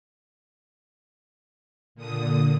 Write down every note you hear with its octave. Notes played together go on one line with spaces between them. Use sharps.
A#2 D3 D#6